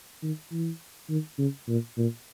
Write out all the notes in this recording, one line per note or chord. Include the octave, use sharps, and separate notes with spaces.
D#3
E3
D#3
C#3
A#2
A#2